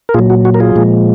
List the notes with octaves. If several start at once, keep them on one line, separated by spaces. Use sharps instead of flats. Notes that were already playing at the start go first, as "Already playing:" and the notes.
A#4
A#2 F#3 F4 G#4
F#4
F#4
A#4
F4 G#4
A#2 F3 G#3